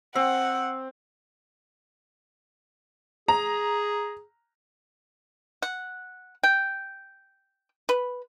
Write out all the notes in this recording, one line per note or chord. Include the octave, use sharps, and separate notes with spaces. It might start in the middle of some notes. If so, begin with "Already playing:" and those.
C4 F#5
G#4 A#5
F#5
G5
B4